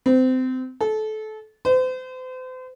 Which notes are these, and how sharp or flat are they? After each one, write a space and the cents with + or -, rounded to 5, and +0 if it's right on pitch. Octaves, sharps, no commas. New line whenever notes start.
C4 -25
A4 -25
C5 -40